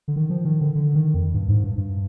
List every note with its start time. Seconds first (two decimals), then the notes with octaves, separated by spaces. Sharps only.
0.08 D3
0.16 D#3
0.30 F3
0.45 D#3
0.61 D3
0.75 D3
0.95 D#3
1.14 F2
1.34 G2
1.48 G#2
1.64 G2
1.78 G2